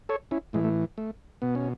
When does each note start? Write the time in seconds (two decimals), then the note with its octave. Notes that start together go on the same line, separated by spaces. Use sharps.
0.09 A4 C#5
0.31 C#4 E4
0.53 A2 E3 G#3
0.64 A3
0.98 A3
1.42 B2 B3
1.55 C#4